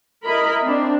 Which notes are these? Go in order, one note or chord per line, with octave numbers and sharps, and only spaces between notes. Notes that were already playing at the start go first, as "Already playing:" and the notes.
E4 A#4 D#5 B5
C4 D4